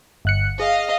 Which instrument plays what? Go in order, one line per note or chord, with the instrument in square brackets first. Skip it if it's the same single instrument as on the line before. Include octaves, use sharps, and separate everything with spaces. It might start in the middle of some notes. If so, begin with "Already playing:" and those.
[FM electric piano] G1 F#6 C#7
[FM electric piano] G#4 [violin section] D#5 F5